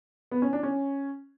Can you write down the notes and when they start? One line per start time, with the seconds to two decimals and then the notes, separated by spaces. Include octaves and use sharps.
0.31 B3
0.42 C#4
0.53 D4
0.63 C#4